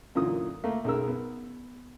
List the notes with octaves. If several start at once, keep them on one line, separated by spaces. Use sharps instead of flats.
F#2 A#2 D3 E3 D#6
A3 A#3
B1 F#2 G#4 A#4 E6
B3